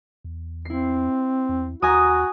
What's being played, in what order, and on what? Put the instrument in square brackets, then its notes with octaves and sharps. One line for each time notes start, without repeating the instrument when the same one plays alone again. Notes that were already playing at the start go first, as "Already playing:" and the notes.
[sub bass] E2
[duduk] C4 [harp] E4 C7
[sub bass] E2
[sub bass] D#2 [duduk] F#4 [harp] G#5 A#5 D#6